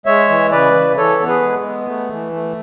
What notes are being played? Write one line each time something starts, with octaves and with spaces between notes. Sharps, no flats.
G#3 C#5 E5
E3
C#3 B4 D5
E3
E3 A4 C#5
B3
G#4 B4
G#3
B3
A3
E3
A3